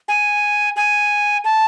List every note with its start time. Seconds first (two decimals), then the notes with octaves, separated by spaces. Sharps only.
0.08 G#5
0.76 G#5
1.45 A5